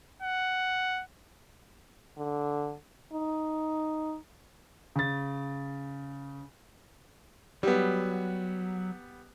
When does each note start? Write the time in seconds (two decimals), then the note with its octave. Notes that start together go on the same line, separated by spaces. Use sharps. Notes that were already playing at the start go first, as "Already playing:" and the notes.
0.22 F#5
2.17 D3
3.13 D#4
4.96 C#3 A6
7.63 F#3 G3 B3